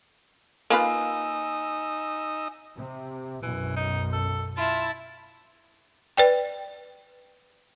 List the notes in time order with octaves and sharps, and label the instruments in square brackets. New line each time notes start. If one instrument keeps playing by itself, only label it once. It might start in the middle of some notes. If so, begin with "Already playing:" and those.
[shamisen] A#3 F4 B4 [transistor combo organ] D#4 D#5 E6 [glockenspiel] G#5
[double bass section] C3
[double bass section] B1 F#2 B2 [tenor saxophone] E3
[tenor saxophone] D#4
A4
[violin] E4 A5 [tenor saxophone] F4
[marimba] B4 D5 G5